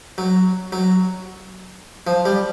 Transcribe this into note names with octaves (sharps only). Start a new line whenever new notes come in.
F#3
F#3
F3
G3